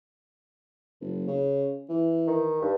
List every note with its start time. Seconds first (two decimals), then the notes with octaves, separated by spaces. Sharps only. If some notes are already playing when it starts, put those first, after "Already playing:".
1.01 F#1
1.27 C#3
1.89 E3
2.27 D#3
2.62 G2